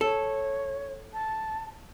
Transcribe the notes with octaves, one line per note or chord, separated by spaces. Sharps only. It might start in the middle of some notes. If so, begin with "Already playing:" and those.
A4 C#5
A5